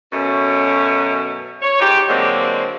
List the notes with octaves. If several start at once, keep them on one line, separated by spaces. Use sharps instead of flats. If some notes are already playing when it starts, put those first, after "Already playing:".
F#2 B2 A3 C#4
C#5
G#2 D#4 G4
D3 F#3 G#3 A#3 C4